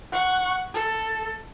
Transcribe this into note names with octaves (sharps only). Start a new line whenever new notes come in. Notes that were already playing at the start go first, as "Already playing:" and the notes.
F#5 C#6
A4